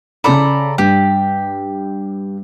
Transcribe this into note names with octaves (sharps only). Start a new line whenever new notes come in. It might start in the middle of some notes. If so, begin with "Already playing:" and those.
C#3 A4 D5 A#5 B5
G2 G4